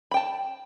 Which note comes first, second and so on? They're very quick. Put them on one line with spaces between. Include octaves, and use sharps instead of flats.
B5 G5 A5